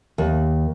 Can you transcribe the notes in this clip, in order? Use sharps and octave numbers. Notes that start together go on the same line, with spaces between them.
D#2